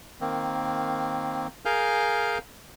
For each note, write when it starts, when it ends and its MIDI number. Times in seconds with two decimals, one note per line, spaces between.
0.21 1.47 51
0.21 1.47 58
0.21 1.47 60
1.65 2.38 68
1.65 2.38 70
1.65 2.38 77
1.65 2.38 80
1.65 2.38 89
1.65 2.38 91